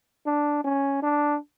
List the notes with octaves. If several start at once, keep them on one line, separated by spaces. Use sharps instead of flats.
D4
C#4
D4